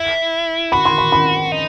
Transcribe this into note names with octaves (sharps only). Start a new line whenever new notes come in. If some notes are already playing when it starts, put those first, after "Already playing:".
Already playing: E4
F#4 B5
C6
B5
B5
D#4